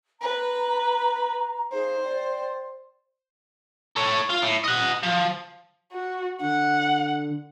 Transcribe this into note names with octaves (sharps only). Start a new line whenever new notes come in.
B4 A#5 C6
D#4 G#4 C5 F5
D5 G5 C6
A4 C#5
F4
A2
D#5 F#5
F3
F#4
D3 F#5